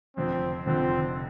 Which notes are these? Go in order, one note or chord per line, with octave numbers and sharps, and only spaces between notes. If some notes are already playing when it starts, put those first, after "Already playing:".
F1 F2 D3 F3 C4
F1 F2 D3 F3 C4